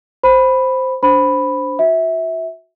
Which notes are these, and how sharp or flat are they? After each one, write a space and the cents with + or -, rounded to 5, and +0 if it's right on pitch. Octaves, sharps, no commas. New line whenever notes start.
C5 +0 B5 +0
D4 -15 C5 +0 B5 +0
F#4 -25 E5 -15